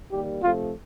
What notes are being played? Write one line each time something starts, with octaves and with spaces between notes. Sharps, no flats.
D#3 G3 A#3 G4
C3 F3 A3 F4